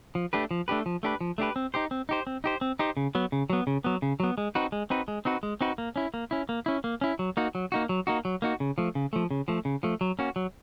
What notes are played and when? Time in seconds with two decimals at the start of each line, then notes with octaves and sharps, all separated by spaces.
0.15 F3
0.33 A3 D4 G4 B4
0.51 F3
0.68 A3 D4 G4 B4
0.86 F3
1.03 A3 D4 G4 B4
1.21 F3
1.38 A3 D4 G4 B4
1.56 C4
1.74 D#4 G4 C5
1.91 C4
2.09 D#4 G4 C5
2.27 C4
2.44 D#4 G4 C5
2.61 C4
2.79 D#4 G4 C5
2.97 C#3
3.15 F#3 B3
3.32 C#3
3.50 F#3 B3
3.67 C#3
3.84 F#3 B3
4.02 C#3
4.20 F#3 B3
4.38 G#3
4.55 C4 D#4 F#4 B4
4.72 G#3
4.90 C4 D#4 F#4 B4
5.08 G#3
5.25 C4 D#4 F#4 B4
5.43 G#3
5.61 C4 D#4 F#4 B4
5.78 A#3
5.96 C#4 E4
6.14 A#3
6.31 C#4 E4
6.49 A#3
6.66 C#4 E4
6.84 A#3
7.01 C#4 E4
7.19 F#3
7.37 A#3 D#4 F#4
7.55 F#3
7.72 A#3 D#4 F#4
7.89 F#3
8.07 A#3 D#4 F#4
8.25 F#3
8.42 A#3 D#4 F#4
8.60 C#3
8.78 F3 A3
8.95 C#3
9.13 F3 A3
9.31 C#3
9.48 F3 A3
9.65 C#3
9.83 F3 A3
10.01 F#3
10.19 A#3 C#4 F#4
10.36 F#3